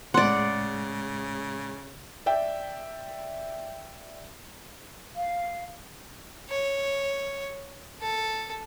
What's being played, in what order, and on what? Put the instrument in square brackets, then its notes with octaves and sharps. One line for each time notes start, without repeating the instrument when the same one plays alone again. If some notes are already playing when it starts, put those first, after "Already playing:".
[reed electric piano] A2 G#3 [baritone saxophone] C#3 [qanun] D5 F#5 [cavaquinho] C6
[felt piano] D5 E5 G5
[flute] F5
[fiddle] C#5
A4